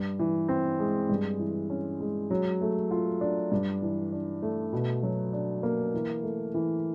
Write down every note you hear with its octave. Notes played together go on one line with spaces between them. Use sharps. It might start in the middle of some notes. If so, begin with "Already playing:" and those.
Already playing: G2
E3
C4
G#3
G2
E3
C#4
G#3
F#3
A3
F4
D4
G2
E3
D4
A3
B2
F#3
D4
A#3
E3
A3
E3